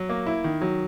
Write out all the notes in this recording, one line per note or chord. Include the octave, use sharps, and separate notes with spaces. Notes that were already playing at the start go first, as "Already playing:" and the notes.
Already playing: F#3
A#3
E4
D#3
F#3